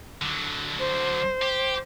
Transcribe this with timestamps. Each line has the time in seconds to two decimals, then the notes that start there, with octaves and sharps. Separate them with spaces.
0.22 D3 F#3
0.79 C5
1.42 G4